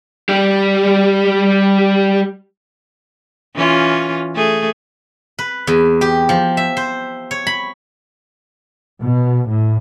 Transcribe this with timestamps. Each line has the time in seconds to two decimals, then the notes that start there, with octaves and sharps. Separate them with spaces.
0.29 G3 G4
3.55 E3 C#4 F4
4.35 A3 G#4
5.39 B4
5.67 E2
6.01 G4
6.29 F3
6.57 E5
6.77 C5
7.31 C#5
7.47 B5
9.00 B2
9.47 A2